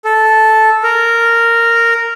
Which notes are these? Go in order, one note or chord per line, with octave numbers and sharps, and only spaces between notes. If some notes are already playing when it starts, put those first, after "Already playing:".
A4
A#4